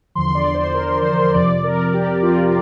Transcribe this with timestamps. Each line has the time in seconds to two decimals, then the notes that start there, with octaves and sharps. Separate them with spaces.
0.15 E2 D3 F3 C6
0.35 D5
0.49 D5
0.54 C5
0.75 A#4
1.05 C5
1.34 F2 C3 F3 D5
1.64 A#4
1.94 G4
2.23 F4